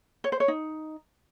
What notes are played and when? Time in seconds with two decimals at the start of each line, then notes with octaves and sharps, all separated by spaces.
0.24 C#5
0.32 C5
0.40 C#5
0.48 D#4